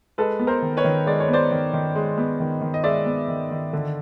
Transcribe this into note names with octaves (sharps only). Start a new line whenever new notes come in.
G#3 A4 B4
B3
A#4 C5
D#3
B4 C#5
D#3
G#3 D5
C#5
B3
C5 D5
D#3
D#3
G#3
B3
D#3
D#3
D#5
G#3 D5 E5
B3
D#3
D#3
D3